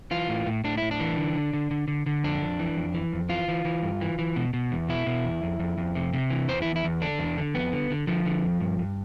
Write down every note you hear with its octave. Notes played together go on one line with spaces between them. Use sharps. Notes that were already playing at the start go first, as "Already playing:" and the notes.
E3 F4
A2
A2
A2 D4
A2 E4
D4
E3
D3
D3
D3
D3
D3
D3
F2 D4
F2
E3
F2
E3
F2
E3 F4
E3
E3
G2
E3
E3
B2
B2
E2
B2 E4
B2
E2
F2
F2
F2
C3
C3
E3
E2 C5
E2 E4
E4
E2
D3 D4
E2
D3
F2 B3
D3
D3
D3 F3
D3
F2
G2
G2